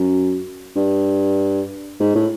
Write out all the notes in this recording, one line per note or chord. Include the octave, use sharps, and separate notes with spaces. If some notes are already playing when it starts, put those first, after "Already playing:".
Already playing: F#2
G2
G#2
A2